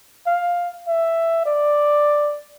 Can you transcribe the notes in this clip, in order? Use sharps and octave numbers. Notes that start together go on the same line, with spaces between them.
F5
E5
D5